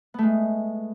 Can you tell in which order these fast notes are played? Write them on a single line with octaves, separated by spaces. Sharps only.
B3 A3 G#3